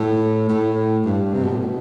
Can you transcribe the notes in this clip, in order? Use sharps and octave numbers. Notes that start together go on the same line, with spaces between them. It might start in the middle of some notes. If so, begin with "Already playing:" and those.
Already playing: A2
A2
G2
C3
B2
A2
B2